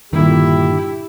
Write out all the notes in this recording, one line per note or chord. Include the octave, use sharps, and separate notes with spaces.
G2 A#2 D3 D#3 E4 G4